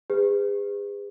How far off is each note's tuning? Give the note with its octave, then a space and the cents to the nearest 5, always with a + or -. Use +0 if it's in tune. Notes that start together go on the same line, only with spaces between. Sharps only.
G#4 -40 B4 +35